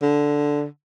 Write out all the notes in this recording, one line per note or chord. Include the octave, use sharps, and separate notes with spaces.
D3